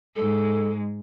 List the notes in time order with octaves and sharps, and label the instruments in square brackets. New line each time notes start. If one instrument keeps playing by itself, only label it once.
[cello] G#2 G#3 [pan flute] A4